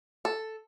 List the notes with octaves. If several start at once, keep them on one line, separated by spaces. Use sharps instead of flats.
A4